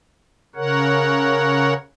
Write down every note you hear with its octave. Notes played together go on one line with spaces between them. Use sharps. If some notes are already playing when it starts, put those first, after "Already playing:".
C#3 A#4 C#5 F#5